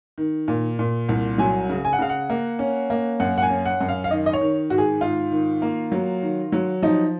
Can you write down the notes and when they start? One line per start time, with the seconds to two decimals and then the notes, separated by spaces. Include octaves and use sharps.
0.18 D#3
0.48 A#2
0.79 A#2
1.09 C2
1.38 F#3 G#5
1.69 C#3
1.85 G#5
1.93 F#5
1.99 C#3 F5
2.09 F#5
2.30 A#3
2.59 C#4
2.90 A#3
3.20 F#2 F#5
3.38 F#5
3.42 G#5
3.50 C#4
3.66 F#5
3.81 F#2
3.88 F5
4.04 F5
4.11 D#3 D#5
4.26 D#5
4.33 C#5
4.41 D#3
4.70 G#2 F#4
4.78 G#4
5.01 G#2 F4
5.31 D#3
5.62 A#3
5.92 F#3
6.22 D#3
6.52 F#3
6.83 F3 D#4